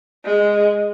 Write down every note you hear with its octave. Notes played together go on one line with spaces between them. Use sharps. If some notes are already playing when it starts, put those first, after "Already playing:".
G#3